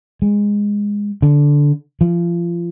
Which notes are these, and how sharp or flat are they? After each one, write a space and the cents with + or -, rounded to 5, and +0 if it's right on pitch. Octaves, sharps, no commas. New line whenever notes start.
G#3 -15
D3 -10
F3 -30